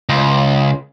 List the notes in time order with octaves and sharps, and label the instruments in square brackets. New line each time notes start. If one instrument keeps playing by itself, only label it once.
[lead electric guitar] C#2